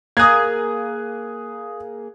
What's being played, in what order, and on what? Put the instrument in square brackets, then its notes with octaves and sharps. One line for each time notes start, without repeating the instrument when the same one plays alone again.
[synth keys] A#3 G#4 [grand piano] D#6 F#6 G#6